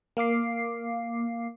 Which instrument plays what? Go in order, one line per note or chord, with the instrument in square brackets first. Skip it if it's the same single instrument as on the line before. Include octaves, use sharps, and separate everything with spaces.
[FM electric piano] A#3 F5 D6 C7